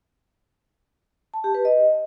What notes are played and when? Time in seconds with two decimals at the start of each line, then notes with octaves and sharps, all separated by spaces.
1.34 A5
1.44 G4
1.55 B4
1.65 D#5